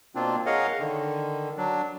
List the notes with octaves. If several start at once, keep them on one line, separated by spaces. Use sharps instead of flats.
B2 A#3 C4 D4 F4
G#4 A#4 C#5 D#5 F5 F#5
D3 D#3
F#3 D4